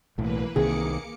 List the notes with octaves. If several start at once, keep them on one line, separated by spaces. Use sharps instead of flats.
B1 A2 E3 A#3 B4
C2 C3 D#3 A#3 G#4 D6 C#7